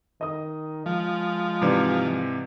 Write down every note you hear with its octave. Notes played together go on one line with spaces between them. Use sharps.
D#3 D#5 D#6
F3 G#3
G#2 C3 E3 B4 D5